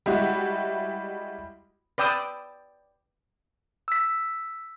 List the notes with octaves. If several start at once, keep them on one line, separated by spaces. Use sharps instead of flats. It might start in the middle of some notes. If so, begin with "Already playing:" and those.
G3 G#3 E4 F#4
B4 D5 G5 D#6 E6
E6 B6